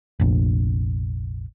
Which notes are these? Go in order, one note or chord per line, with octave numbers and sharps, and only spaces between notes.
F1 A#1